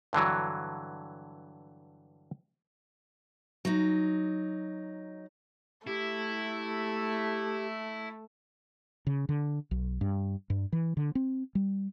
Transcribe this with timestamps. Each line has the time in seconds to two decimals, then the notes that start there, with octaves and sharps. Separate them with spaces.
0.13 G2 D3 E3 F#3
3.65 F#3 D#4
5.87 A3 E4 G4
9.07 C#3
9.29 D3
9.71 B1
10.01 G2
10.50 G2
10.72 E3
10.97 D3
11.15 C4
11.55 G3